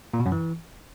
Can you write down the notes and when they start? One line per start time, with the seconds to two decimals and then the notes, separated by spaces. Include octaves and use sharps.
0.14 A#2
0.20 B2
0.26 F#2
0.32 E3